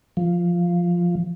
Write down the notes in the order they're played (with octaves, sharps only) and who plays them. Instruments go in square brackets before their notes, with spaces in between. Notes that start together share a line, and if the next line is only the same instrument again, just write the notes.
[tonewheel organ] F3